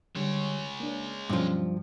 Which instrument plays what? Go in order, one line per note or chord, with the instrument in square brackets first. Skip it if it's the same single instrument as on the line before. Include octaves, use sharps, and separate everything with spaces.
[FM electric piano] D3 G3 [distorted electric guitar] G#3 C#5
[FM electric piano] A#3 D4
[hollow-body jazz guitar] G2 F3 [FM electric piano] B2 F#3 C#4